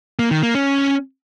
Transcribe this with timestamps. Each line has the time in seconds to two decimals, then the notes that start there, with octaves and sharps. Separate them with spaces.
0.19 A#3
0.31 D#3
0.43 A#3
0.55 C#4